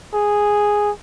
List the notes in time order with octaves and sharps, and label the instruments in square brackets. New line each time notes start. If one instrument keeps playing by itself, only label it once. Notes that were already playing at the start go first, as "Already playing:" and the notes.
[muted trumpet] G#4